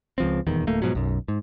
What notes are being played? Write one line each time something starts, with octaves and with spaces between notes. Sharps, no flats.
C#2 F3 C4
D#1 E2 D#3
D1 A3 A#3
G#2 B2 F3 F#3
B1 F#2
G#2